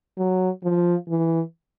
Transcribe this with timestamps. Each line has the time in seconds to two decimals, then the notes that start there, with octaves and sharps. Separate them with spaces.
0.18 F#3
0.64 F3
1.09 E3